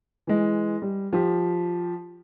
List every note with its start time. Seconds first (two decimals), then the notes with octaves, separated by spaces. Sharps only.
0.27 E3 G#3
0.82 G3
1.13 F3 G4